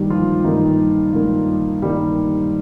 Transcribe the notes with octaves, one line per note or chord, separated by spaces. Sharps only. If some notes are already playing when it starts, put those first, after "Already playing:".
Already playing: G2 D#3 G3 A#3 G4
F3 F4
G2 D#3 A#3 D#4
G2 D#3 A#3
G2 D#3 G3 A#3 G4